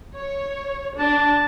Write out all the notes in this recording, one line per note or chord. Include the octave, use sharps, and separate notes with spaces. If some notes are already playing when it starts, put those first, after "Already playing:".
C#5
D4 A5